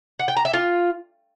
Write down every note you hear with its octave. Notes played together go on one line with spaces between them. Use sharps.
F#5
G5
A#5
E5
F4